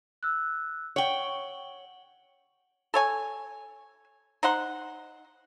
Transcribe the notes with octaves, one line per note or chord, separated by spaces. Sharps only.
E6 F#6
C#5 F#5 G5 F#7 G7
A4 C#5 G#5
D#4 C5 F#5 C6